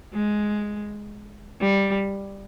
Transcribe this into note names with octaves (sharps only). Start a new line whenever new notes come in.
G#3
G3